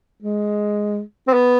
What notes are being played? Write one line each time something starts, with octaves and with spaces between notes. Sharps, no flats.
G#3
C4
B3